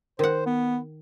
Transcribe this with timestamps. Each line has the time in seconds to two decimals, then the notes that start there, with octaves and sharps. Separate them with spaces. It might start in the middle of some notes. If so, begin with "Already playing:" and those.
0.19 D#3 C5 F#5
0.46 B3